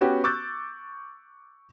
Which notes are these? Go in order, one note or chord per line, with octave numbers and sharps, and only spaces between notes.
B3 C#4 F#4 G4
C#6 D6 E6 F#6 G6 A6